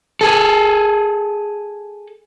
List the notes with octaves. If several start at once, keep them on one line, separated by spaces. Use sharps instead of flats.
G#4 A4